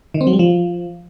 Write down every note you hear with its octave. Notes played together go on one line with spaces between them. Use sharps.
D#3
C4
F#3
G3
F3